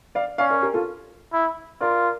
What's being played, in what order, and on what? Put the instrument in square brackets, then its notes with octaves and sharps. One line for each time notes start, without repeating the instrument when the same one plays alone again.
[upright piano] D5 F5
[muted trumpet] C#4 [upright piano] D5 F5
[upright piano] A#4 D5
G4 A#4
F4 A4
[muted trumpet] E4
[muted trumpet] F4 [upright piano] A#4 D5